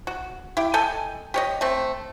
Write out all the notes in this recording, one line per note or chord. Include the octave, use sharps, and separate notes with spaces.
F#4
E4 G4
A4 D#5 G5 G#5
G4 C#5 D#5
A3 C4